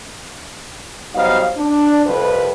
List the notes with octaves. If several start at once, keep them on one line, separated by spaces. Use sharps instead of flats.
F#3 G3 B3 D#4 C5 F5
D4
C2 F2 B4